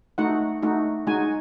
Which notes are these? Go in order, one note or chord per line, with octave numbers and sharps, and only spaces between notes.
A3 D#4 F#4 F#5
A3 D#4 F#4
G#3 D#4 F#4 G#5